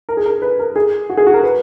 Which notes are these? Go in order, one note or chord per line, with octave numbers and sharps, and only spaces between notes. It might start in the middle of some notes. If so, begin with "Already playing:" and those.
A#4
G#4
A#4
B4
A#4
G#4
F#4
G#4
F#4
A#4
B4